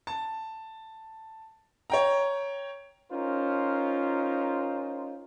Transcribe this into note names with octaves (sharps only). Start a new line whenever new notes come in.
A5
C#5 G5 A#5
C#4 D#4 F4 A#4 C5